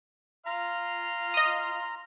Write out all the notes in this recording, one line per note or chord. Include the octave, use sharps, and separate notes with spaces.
F5 A#5 C6 F6
D#5 D#6